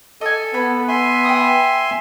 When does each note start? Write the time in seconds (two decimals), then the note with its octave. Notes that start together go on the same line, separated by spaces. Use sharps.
0.21 A4 D#5 G#5
0.54 B3 B4 B5
0.88 E5 G#5 C6
1.24 G5 B5 D#6